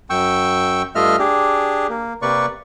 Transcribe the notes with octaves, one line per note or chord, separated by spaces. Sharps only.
F#2 G5 C#6 E6
G2 A3 F4 D#5 E5 F6
D4 G4 G#4
A#3
C3 A#3 B4 D5 C#6